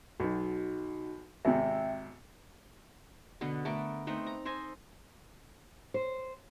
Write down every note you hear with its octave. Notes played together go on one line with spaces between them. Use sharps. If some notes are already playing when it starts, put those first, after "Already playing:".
B1 D#4 F#4
G#1 C3 E5 G5
B2 D3 B3
A3 B3 A#4 D5
A3 B3 C4 D#4
A#5
A4 C5 D#5 G#5
C5